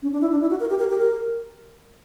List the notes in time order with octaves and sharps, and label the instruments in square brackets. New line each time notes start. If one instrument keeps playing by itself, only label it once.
[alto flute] C#4
D4
E4
D4
E4
F#4
A#4
G4
A#4
G4
A#4